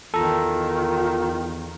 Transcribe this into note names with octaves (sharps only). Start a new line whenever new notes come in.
E2 D#3 F4 A4 A#5